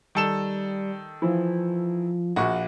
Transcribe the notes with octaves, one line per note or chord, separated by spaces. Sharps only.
D#3 G3 A4 E7
E3 F3 E4
A#1 F4 F#4 C#6